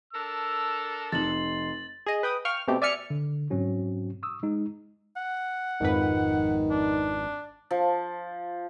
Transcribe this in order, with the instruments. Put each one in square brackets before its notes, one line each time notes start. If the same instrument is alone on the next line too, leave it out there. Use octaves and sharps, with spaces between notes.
[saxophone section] D4 A4 A#4 [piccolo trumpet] E6
[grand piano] F1 D#4 [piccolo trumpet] C6 [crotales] A6 F#7
[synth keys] G#4 D#5
B4 G5 D#6
F5 G5 C#6 F6
B2 A3 C4 G4
D5 E5 G#5 F6 C#7
[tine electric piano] D3
G#2 F#3 C4 C#4 F#4
C#6 D#6 E6
G#3 D#4
[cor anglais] F#5
[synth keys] G#1 F2 B4 [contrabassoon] D#3
[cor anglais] D4
[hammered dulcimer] F3